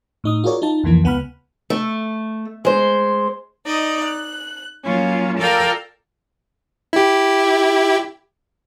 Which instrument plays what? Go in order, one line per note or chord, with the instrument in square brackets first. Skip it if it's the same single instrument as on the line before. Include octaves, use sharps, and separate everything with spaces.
[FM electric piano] A2 D#4 D#6
F4 F#4 G#4 A#4 C#5 D5
D#4 F4 A5
C2 F2 E3 A#3 E4
C#2 B3 F#5 B5 F6
[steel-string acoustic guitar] A3
G#3 C5
[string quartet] D#4 D5 D#5
F#6
F#3 A#3 C#4 F4
F4 A4 A#4 D5 F5 G5
[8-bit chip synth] E4 G4